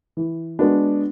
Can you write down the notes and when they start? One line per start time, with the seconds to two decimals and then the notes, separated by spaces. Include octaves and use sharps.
0.17 E3
0.59 G#3 B3 D4 F#4